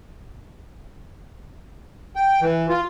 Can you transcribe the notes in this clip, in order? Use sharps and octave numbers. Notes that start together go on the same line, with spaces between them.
G5
E3
F4